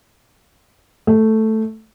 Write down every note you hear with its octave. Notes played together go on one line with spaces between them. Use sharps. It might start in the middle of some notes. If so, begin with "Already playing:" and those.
A3